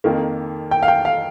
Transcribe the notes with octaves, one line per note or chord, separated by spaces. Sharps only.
F2 D#3 A#3
G5
F5
G5
F5